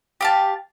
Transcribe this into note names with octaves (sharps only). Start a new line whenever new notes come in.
G4 F5 A5